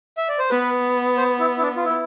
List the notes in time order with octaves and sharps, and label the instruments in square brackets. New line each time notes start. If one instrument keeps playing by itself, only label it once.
[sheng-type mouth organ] E5
D5
C5
[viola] B3 [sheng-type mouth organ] B4
[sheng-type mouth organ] C5
E4
E4
D4
F4
E4